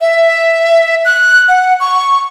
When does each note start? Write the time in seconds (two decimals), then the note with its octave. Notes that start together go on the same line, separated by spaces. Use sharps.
0.01 E5
1.05 F#6
1.48 F#5
1.80 C#6